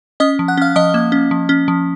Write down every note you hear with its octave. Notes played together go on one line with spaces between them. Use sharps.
C#4 D#5 D#6
F3
F#5 F#6
C#4 F5 F6
F3 D#5 D#6
A#3
C#4
F3
C#4
F3